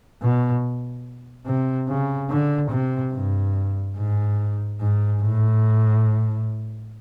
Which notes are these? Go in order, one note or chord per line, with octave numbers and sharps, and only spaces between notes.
B2
C3
C#3
D3
C3
G2
G#2
G#2
A2